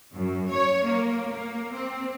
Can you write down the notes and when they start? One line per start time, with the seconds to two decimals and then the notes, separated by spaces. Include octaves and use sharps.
0.13 F#2
0.52 C#5
0.85 A#3
1.32 A#3
1.73 C4